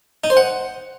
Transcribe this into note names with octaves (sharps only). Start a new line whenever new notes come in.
D#4
C5
F#5